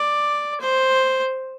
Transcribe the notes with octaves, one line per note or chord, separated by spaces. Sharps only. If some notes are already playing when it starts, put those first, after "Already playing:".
Already playing: D5
C5